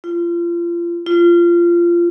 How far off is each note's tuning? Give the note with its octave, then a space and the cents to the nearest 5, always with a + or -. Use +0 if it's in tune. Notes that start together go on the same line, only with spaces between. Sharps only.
F4 -30
F4 -20